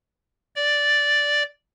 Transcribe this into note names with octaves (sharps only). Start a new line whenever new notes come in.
D5